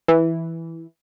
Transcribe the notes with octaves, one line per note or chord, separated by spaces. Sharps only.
E3